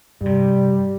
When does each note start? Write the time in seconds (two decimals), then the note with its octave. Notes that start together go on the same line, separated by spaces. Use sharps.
0.21 G2 C3 G3